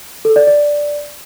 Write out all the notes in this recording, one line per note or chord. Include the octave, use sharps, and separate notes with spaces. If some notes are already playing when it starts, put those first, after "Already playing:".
A4
D5
D5